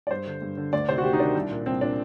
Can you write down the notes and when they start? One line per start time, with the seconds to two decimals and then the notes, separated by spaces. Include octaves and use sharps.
0.07 D5
0.11 G2 C5
0.27 D3
0.42 G2
0.57 D3
0.73 D2 D5
0.89 C3 D#3 C5
0.98 F#4
1.03 D2 G4
1.13 D#4
1.19 C3 D#3 D4
1.35 C2
1.51 A#2
1.66 C2 C4
1.81 A#2 D4